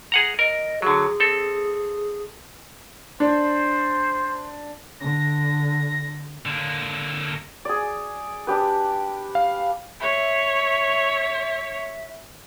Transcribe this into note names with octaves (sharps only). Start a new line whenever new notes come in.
G#4 F#5 A#5
A#4 D#5
D3 F#3 G#4
C4 A4
D4 C5
D3 A#6
D3 A#3
G#4 D5
D4 G4 B4
F5
C#5 E5